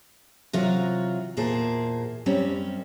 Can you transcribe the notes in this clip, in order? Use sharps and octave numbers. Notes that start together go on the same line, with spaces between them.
C3 E3 F#3 F4 F#4 A#5
E2 A#2 A#3 G#4 C5 A5
F#2 G3 C4 C#4